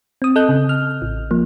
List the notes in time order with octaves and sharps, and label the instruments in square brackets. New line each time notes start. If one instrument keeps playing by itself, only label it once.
[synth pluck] C4 D#6
A4 D#5 F#6 G6
C#3
F6
A1
F3 A#3